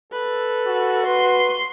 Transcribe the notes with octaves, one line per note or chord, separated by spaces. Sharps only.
A4 B4
F#4
B4 C6